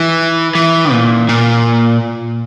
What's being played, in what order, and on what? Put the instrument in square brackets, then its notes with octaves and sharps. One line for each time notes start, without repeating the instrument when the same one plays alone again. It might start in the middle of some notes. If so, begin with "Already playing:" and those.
Already playing: [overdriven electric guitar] E3
E3
A#2
A#2